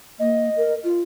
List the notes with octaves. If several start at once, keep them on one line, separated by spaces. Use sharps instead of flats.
A#3 D#5
A#4
F4